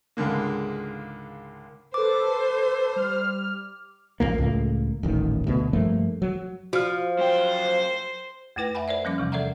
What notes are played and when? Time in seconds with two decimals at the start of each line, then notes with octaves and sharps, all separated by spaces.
0.17 C#2 G#2 D3 A#3
1.94 A4 B4 C5 D6
2.96 G3 F6
4.20 A1 F2 A#2 A#3
4.38 C#2 A2 A#3
5.03 D#1 A1 D#3
5.47 D2 B2
5.73 G2 F3 A3 A#3
6.22 F#3
6.73 F3 F#4 F6
7.18 F#2 C5 G5
8.56 F2 A3 E4 B4 G5 A#6
8.75 E5 F#5 G#5 B5
8.88 A#4 C5 D5 E5
9.05 F3 G3 A#3 C#4 D6
9.18 E2 C3 E3
9.32 A4 A#4 D5 E5 F#5 A#5